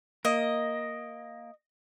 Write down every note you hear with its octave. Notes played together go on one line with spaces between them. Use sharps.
A#3 D#5